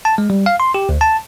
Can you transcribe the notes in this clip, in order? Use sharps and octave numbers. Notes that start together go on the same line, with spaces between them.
A5
G#3
G3
F5
C6
G4
D2
A5